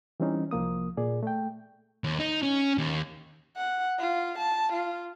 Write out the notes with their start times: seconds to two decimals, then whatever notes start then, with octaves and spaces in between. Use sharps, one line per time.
0.20 E3 G3 C4 C#4 D#4
0.51 C2 F3 A#3 D#6
0.97 A#2 G#4 D5
1.23 A3 G5
2.04 D#2
2.20 D#4
2.43 C#4
2.78 D#2
3.57 F#5
3.99 F4
4.38 A5
4.73 F4